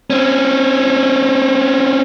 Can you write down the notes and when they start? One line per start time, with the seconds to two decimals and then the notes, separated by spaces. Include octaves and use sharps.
0.10 C4 C#4